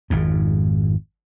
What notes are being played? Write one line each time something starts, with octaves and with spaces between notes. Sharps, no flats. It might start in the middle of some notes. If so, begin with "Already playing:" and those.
G#1 F2 G#2